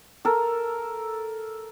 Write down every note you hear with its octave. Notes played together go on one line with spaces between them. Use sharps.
A4 A#4